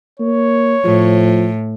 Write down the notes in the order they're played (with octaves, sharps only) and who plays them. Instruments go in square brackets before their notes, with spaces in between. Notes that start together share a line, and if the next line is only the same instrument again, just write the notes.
[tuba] A#3 [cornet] C#5
[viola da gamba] A2 [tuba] F3